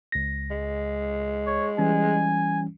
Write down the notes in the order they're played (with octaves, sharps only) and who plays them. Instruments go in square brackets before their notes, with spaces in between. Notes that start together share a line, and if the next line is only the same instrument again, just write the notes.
[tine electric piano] C#2 A#6
[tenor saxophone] G#3
[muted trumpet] C#5
[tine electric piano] E3 G3 C#4 [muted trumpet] G#5